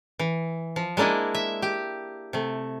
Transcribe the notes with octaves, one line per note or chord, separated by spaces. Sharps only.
E3
F3
G#3 A#3 D4 E4 D#5
E5
G4
C3 A3